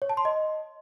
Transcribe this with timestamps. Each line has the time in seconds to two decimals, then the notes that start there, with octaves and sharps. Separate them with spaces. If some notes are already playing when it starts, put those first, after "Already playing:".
0.02 C#5
0.09 A5
0.17 C6
0.25 D#5